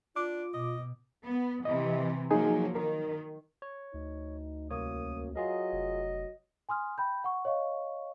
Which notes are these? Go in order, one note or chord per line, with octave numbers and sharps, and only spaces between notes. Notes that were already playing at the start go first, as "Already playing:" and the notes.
D4 F4 D6
B2 D#5
B3
C3 E3 D#5
F3 F#3 A#3 D#4 G#4 G#5
D#3 A#4
C#5
D2 D#4
C2 F#2 A#3 C#5 D#6
F#3 F4 G#4 A#4 D#5
F1
G#5 C6 D#6 F6
G5 B5 G6
F#5 C#6
C#5 D#5 F5 C#6